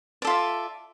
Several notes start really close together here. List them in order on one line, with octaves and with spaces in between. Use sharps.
D5 A4 F4 E5